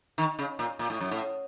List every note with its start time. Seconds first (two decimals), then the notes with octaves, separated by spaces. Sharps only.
0.18 D#3
0.39 C#3
0.59 A#2
0.79 A#2
0.90 A2
1.00 F#2
1.11 A2